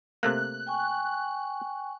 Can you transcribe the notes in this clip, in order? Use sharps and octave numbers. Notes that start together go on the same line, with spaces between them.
C3 A3 A#3 F#6
G5 G#5 C#6